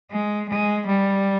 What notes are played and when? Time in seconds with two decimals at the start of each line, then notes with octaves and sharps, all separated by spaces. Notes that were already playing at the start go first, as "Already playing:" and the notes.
0.11 G#3
0.49 G#3
0.86 G3